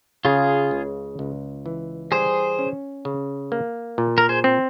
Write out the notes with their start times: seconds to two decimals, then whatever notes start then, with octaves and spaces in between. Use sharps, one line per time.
0.25 C#3 F4 G#4
0.71 C#2
1.19 C#2
1.66 E3
2.11 G3 G#4 C5
2.59 C#4
3.05 C#3
3.52 A#3
3.98 A#2
4.18 A#4
4.29 G#4 C5
4.44 C4